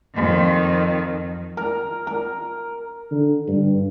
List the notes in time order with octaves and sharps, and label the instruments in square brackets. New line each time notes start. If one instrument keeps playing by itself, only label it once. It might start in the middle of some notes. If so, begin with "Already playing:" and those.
[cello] F2 D#3
[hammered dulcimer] A#4
A#4
[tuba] D3
G2